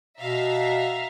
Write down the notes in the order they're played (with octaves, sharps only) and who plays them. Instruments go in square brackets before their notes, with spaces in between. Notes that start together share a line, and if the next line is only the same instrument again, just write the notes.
[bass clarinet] B2 [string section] E5 F5 A#5